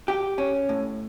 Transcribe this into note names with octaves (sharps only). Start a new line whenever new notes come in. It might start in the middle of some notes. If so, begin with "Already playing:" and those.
G4
C#4
A2